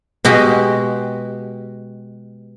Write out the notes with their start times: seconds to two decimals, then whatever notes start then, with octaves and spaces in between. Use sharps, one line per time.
0.25 B2 G#3 F#4 G4